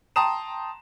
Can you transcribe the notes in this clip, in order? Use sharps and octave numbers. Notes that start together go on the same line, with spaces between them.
G5 A5 A#5 C6 D#6 E7